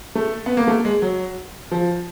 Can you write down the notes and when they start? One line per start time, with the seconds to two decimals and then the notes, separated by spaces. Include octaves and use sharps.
0.15 A3
0.46 B3
0.57 A#3
0.68 A3
0.85 G#3
1.02 F#3
1.71 F3